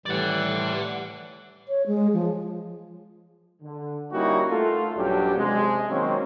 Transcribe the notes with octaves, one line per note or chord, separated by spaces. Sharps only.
A2 E3 G3 D5 F#5
C#5
G#3
F3
D3
G3 A#3 C#4 D#4 E4 F#4
A3 F4 A4
A#1 G2 F#3 C#4 D4 G4
C3 G#3
D#3 F#3 G#3 A#3 C4 C#4